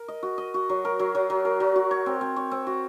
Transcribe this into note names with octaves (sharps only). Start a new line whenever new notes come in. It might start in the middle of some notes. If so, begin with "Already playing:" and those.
Already playing: A#4
D#5
F#4
D#5
F#4
F#3
A#4
F#3
F#3
F#3
A#4
F#3
F#4
C#5
C4
C4
C#5
C4
F#4